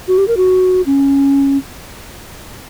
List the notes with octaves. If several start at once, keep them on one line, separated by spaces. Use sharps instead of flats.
F#4
G4
A#4
F#4
C#4